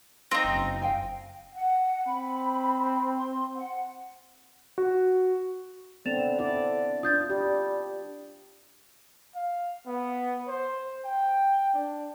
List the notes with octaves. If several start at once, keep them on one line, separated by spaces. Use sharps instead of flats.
C4 D#4 G#4 F5 A#5
F#1
F5 G5 G#5
F#5
C4 B5
C6
F#5
F#4
D3 B3 C4 A6 E7 F7
E4 D5
D4 F4 D#6 G6 A6
G3 G4
F5
B3
C5
G5
D4